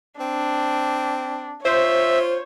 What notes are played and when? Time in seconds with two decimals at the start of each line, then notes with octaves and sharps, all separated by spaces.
0.20 C4 D4
1.65 F4 C5 C#5 E5